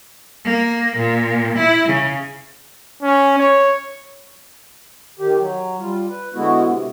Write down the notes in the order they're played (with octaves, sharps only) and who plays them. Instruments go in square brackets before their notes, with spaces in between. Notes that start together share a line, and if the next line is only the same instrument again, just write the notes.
[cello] A#3
A#2
E4
C#3
[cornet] C#4
C#5
[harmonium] D#3 G4
F#3
G3 F4
B4
D3 G#3 B3 E4 F#4
C3